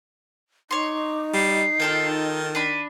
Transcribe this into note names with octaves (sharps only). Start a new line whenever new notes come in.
D#4 C#5 C6 D6
G3 C7
D#3 F4 A4 G5
D4 B5 D#7